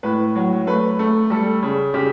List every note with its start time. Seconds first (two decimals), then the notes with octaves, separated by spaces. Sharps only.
0.03 A2 B4
0.35 F#3
0.67 A3 B4
0.99 A3
1.30 G3 A4
1.62 C#3
1.94 C#3 G4